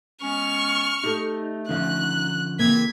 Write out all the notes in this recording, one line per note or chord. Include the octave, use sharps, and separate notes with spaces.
G#3 B3 C#4 C#6 F6
A3 D#4 G4 A4
D3 F3 C#4 D#4 F5 F#6
C#3 E3 A#3 C4 G#6 B6